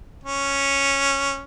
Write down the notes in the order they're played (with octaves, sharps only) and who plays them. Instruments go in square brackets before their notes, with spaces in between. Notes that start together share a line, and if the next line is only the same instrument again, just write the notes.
[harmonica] C#4